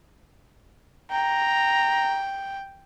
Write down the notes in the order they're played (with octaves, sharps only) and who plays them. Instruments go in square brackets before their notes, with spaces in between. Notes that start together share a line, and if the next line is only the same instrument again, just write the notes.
[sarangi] G5 [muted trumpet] A#5